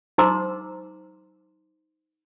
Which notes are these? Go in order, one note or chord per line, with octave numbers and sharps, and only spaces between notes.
D#4 C5 A#5 C6 D6 E6